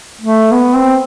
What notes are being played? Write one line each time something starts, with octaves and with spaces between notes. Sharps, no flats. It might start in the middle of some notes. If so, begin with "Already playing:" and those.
A3
B3
C4